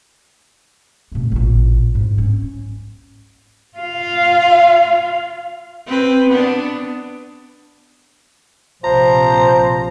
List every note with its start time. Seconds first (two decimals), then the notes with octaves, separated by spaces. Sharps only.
1.12 B2 A3
1.32 A1 A#2
1.95 G#2
2.18 C#4
3.78 F4 F5
5.87 C4 B4
6.29 B3 D4
8.84 A#1 C3 F3 C5 A#5